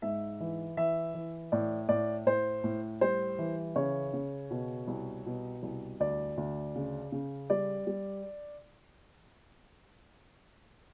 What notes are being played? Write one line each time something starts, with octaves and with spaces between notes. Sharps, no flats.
G#2 E5
E3
E3 E5
E3
A2 D5
A2 D5
A2 C5
A2
G3 C5
E3
C#3 C#5
C#3
B2
C2
B2
C2
D2 D5
D2
C#3
C#3
G3 D5
G3